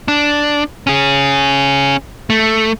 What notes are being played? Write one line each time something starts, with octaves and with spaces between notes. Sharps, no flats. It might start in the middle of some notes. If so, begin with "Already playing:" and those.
D4
C#4 G#4
A3